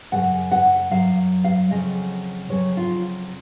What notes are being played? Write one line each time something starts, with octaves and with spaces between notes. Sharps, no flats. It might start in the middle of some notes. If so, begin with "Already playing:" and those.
F#2 C#3 F#3 F#5
F#5
F#2 C#3 F#3 F5
F5
F2 C#3 F#3 D#5
F2 C#3 F#3 C#5
F4